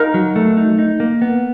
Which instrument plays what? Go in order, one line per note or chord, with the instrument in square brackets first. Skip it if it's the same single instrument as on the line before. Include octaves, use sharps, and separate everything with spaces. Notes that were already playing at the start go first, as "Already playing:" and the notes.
Already playing: [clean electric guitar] D#4 [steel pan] A#4
[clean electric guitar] F#3
A3
D#4
D#4
A#3
B3